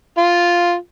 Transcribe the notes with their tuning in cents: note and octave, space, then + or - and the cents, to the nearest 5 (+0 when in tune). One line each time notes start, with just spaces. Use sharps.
F4 +0